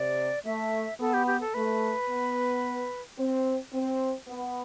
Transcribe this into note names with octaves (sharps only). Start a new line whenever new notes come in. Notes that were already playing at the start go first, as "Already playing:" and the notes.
Already playing: C3 D5
A3 E5
B3 A4
G4
G4
A4
A3 B4
B3
C4
C4
B3